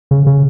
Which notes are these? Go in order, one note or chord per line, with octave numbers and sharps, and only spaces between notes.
C#3
C#3